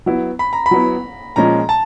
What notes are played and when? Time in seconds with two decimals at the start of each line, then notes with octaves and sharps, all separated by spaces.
0.06 F#3 B3 E4
0.39 B5
0.53 A#5
0.66 B5
0.71 F#3 B3 E4
1.36 A#2 F3 G#3 C#4 A#5
1.69 A5